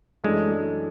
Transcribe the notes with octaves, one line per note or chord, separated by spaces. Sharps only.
F#2 E3 G#3 A3 D4 A4